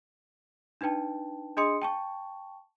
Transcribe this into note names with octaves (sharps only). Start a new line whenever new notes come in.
D4 D#4 B4 G5 A5
D4 G#4 D#5 C6 D#6 C#7
G5 A5 C#6